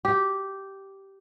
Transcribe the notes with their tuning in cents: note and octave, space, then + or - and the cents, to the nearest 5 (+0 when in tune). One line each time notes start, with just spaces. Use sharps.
G4 -10